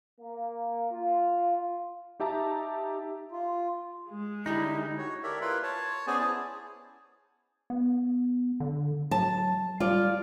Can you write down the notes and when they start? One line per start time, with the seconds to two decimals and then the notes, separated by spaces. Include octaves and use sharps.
0.20 A#3
0.92 F4
2.20 D#4 G4 E5 A5 A#5
3.31 F4
4.10 G#3
4.46 D3 G3 D#4 E4 G#4
4.98 F#4 C#5
5.23 G4 A4 A#4 C#5 D5 E5
5.41 E4 F4 A#4 B4 B5 C6
5.63 C#5 A5
6.07 B3 C#4 G#4 C5 D5 G#5
6.19 E4 G#4 A5
7.70 B3
8.60 D3
9.11 F#3 A5
9.80 G3 F4 D5